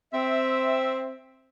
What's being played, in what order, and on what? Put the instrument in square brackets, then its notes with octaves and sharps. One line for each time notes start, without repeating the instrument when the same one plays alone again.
[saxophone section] C4 E5